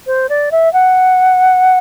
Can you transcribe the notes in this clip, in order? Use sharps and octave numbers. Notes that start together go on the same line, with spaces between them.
C5
D5
E5
F#5